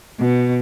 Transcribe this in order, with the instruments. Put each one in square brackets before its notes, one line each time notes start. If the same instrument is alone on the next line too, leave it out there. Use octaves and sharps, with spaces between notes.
[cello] B2